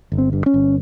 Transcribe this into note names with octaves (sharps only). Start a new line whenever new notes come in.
G1
C4
G2
C#4
G1